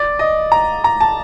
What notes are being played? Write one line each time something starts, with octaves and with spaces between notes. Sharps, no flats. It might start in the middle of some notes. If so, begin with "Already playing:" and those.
Already playing: D5
D#5
A#5
A#5
A5